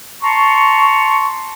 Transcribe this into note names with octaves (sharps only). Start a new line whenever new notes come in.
A5 A#5 C6 C#6